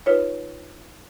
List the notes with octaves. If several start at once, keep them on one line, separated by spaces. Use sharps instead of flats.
D#4 F4 B4 C#5